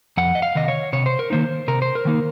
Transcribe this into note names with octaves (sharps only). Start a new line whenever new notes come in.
F2 F#5
D#5
F5
C3 D#3 D#5
C#5
C3 C#5
C5
A#4
D#3 A#3 D#4 C5
C3 A#4
C5
A#4
D#3 A#3 D#4